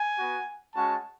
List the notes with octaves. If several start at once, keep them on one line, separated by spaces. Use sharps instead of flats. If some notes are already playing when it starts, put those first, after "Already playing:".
Already playing: G#5
B3 F#4
G#3 C#4 F#4 A5